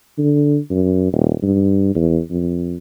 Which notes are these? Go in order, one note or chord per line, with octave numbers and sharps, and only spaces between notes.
D3
F#2
D#1
G2
E2
F2